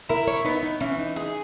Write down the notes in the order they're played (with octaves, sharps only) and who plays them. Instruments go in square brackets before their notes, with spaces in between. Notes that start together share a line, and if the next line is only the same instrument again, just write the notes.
[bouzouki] E4 [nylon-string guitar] A#4
[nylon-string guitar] C#5
[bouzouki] B3 [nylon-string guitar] D#4
[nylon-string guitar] D#4
[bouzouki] E3 [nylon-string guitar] C#4
[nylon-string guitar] D#4
[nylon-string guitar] D#4 [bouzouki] G#4